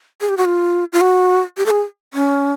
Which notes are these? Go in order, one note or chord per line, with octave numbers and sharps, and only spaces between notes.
G#4
G4
F#4
F4
F4
F#4
G4
A4
G#4
C#4